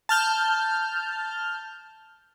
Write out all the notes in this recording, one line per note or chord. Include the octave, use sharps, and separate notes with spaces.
A5 F6 G6